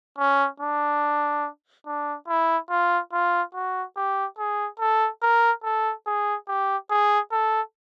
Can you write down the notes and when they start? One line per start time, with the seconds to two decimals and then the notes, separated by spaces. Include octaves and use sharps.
0.18 C#4
0.60 D4
1.86 D4
2.28 E4
2.70 F4
3.13 F4
3.55 F#4
3.96 G4
4.38 G#4
4.80 A4
5.22 A#4
5.64 A4
6.06 G#4
6.48 G4
6.90 G#4
7.32 A4